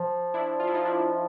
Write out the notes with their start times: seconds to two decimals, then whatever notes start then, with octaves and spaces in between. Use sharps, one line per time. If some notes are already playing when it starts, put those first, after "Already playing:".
Already playing: F3
0.34 D4 E4
0.60 F4
0.67 E4
0.74 D#4 F4
0.85 D4 E4